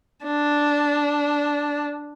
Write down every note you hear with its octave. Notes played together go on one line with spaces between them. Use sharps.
D4